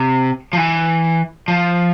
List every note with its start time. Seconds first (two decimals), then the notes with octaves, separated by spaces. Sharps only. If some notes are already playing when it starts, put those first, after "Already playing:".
Already playing: C3
0.53 F3
0.57 E3
1.48 F3